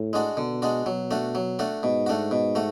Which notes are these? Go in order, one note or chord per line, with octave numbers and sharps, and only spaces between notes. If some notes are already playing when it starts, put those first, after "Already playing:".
Already playing: A2
G#3 D4 F#4
B2 D3
G#3 D4 F#4
B2 F#3
A3 D4 F#4
F#3
A3 D4 F#4
G#2 B2
A3 D4 F#4
B2
A3 F#4